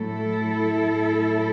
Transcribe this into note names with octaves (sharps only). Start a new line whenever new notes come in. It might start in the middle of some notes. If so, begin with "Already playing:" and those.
Already playing: A2 F#3 A3 E4 A4
A2 F#3 A3